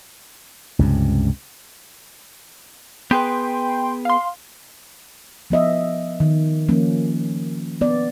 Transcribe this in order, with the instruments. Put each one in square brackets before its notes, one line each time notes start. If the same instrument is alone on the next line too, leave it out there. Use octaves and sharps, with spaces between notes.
[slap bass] C#2 G2 C3
[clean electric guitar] B3 G#4 B4 [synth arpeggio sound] G5 C6
[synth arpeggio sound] F5 C6
[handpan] F3 B3 D#5 E5
D#3
F3 A#3 C#4
B3 D5